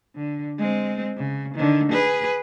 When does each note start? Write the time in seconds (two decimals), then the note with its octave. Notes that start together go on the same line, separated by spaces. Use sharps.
0.15 D3
0.59 G#3 C4
1.17 C#3
1.55 D3 D#3
1.92 G#4 B4